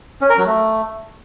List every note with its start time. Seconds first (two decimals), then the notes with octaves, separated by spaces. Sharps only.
0.21 C#4
0.30 A#4
0.38 F#3
0.46 A3